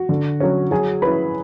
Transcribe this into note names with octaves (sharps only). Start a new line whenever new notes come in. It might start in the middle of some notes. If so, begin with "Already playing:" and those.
Already playing: F#4
D3
F#3 C#4
F#3 G#4 G#5
C#4 E4 B4 B5